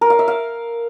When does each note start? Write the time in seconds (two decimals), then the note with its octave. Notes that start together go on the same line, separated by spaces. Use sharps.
0.01 A#4
0.10 F5
0.19 E5
0.28 F5